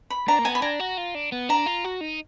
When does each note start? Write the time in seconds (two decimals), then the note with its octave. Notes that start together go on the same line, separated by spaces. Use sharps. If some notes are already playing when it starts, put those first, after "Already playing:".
0.10 B5
0.28 D4 A#5
0.39 A#3
0.45 B3 G#5
0.55 B5
0.62 D4 A#5
0.80 F#4
0.97 F4
1.15 D4
1.32 B3
1.49 D4 A#5
1.66 F4
1.84 F#4
2.01 D#4